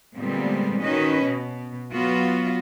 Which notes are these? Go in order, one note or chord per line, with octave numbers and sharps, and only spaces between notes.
A#2 D3 G3 G#3 B3 C4
D#3 C#4 F#4 B4 D#5
B2
F#3 B3 F4 F#4